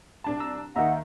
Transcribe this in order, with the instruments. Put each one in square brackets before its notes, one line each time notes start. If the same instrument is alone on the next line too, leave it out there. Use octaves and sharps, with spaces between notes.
[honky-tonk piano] C2 D4 A5
[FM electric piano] A#5 E6
[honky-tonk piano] D#2 D#3 [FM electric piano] D#5 E5 A#5 [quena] F#5